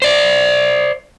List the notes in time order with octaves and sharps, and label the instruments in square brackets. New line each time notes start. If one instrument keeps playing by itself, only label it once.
[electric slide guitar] C5 D5